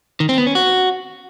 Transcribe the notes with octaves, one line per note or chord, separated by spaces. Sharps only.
D#3
C4
B3
C#4
F#4